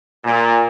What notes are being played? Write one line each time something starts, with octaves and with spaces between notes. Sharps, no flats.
A#2